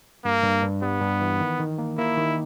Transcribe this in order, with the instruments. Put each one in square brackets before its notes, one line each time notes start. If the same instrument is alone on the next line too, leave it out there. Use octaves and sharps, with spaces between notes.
[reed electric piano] G2 [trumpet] A#3
[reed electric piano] G2
G2
[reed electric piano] G3 [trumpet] B3
[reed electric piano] G2
E3
D#3
D#3
A#3
[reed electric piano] A#3 [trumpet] E4
[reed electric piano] D#3